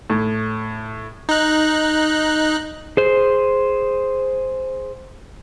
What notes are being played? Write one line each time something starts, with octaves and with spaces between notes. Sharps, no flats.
A2
D#4 F#6
G#4 C5